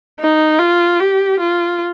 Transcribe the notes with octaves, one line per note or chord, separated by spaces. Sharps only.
D#4
F4
G4
F4